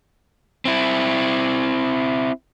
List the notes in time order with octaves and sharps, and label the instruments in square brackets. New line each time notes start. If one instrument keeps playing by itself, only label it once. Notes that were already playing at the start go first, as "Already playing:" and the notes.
[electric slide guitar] C4 E4